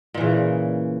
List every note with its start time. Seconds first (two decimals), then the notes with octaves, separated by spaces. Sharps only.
0.14 A#2
0.17 E3
0.20 C#3